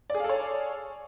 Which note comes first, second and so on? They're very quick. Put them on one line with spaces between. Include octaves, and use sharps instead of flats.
D5 G#4 F5 A4 C#5